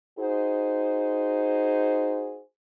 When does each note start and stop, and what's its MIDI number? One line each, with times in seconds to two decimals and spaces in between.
0.19 2.42 63
0.19 2.42 66
0.19 2.42 68
0.19 2.42 72